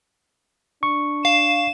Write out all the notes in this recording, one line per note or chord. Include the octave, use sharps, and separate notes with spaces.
D4 C#6
F5 E7